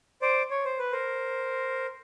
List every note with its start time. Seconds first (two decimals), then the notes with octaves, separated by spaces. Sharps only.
0.22 C5 D5
0.51 C#5
0.65 C5
0.78 B4
0.92 A#4 C5